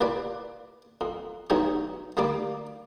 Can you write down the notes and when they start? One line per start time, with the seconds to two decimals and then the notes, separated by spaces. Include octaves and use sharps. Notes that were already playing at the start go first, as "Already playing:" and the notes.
0.01 C2 A#2 B4 D5
1.01 F2
1.50 B1 E2 G2 F#3 D#4 C#5
2.17 D2 G3 A#3 D5 D6